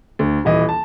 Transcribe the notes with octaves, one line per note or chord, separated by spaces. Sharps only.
D2
D#1 E3 D#5
A5